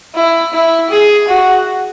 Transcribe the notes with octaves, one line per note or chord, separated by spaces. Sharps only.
E4
E4
G#4
F#4